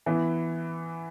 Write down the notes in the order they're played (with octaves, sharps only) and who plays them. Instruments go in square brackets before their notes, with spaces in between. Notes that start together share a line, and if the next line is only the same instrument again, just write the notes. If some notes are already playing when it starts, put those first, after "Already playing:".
[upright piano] E3 B3 E4